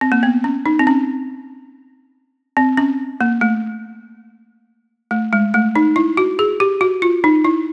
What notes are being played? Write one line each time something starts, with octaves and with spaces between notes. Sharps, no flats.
C4
A#3
B3
C#4
D#4
C4
C#4
C4
C#4
A#3
A3
A3
G#3
A3
D#4
E4
F#4
G#4
G4
F#4
F4
D#4
E4